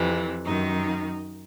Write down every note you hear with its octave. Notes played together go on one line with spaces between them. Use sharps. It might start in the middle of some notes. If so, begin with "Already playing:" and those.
Already playing: F2 C3 E3
F#2 D#3 D#4